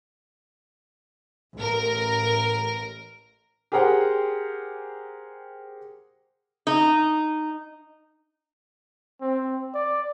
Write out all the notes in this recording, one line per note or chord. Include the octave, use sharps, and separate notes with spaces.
A1 A#4
G4 G#4 A#4 C5 F#5 G5
D#4
C4
D5